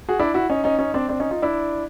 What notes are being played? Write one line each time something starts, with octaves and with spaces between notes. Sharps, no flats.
F#4 G#4
D4 E4
E4 F#4
C#4 D#4
C#4 D#4
C#4 D#4
C4 D4
C4 D4
C#4 D#4
D#4 F4
D4 E4